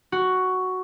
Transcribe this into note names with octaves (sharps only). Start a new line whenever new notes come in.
F#4